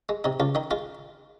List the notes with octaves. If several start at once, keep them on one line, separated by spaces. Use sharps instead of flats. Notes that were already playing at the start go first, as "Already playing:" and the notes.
G#3
C3 D#4
C#2 F4
D#3 D#4
G#3 F4